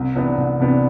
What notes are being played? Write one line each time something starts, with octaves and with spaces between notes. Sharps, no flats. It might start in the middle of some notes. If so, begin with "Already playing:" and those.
Already playing: C2
C3 E3 B3 D4
C2
C3 E3 B3 D4